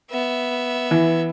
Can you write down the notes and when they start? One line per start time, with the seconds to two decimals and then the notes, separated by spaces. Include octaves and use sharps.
0.11 B3 E5
0.91 E3